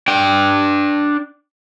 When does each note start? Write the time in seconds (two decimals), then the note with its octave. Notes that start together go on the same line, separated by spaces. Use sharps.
0.08 D4 G5